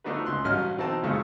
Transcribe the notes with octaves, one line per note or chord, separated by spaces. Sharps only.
F3 A3 D4 D#4 F#4 B4
C#2 C6 F#6
A1 G2 F#3 C#4 D#5 F6
B2 E3 C4 D#4 D#5 A5
C#2 F#2 A#2 C#3 G#3 A3